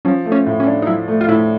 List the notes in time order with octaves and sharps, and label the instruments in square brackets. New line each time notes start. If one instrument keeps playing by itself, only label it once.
[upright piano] F3 [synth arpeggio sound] C#4
[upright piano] A3
[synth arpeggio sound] C#4
[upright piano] A2
[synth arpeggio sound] C#4
[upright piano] D4
[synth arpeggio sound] D#4
[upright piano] F3 [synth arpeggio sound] E4
[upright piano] A3
[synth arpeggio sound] F4
[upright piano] A2 [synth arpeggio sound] E4